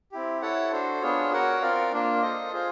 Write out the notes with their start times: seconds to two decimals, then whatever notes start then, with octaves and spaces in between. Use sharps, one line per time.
0.12 C4 E4 G4
0.42 E4 A4 C#5 F#5 A5
0.73 D4 F#4 A4 C5
1.02 B3 D4 F4 G#4 C#5
1.32 F#4 A#4 C#5 F#5
1.62 C4 F4 A#4 D5 F5
1.92 A#3 D4 F4
2.22 F4 A4 C5 D#5
2.53 F4 G#4 C5